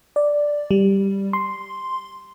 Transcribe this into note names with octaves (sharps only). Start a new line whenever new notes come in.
D5
G3
C6